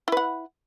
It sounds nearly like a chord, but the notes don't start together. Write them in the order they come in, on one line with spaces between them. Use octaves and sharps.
E4 B4 F#5